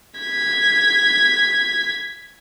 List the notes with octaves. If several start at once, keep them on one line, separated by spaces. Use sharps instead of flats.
G#6 B6